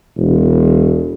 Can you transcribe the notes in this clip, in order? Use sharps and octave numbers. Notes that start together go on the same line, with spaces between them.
E1